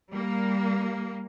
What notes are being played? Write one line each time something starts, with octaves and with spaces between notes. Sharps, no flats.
G3 A#3